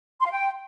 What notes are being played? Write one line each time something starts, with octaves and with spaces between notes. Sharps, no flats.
C6
F5
G5